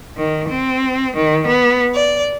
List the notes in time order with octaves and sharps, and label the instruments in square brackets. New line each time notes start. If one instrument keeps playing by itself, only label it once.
[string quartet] D#3
C4
D#3
B3
D5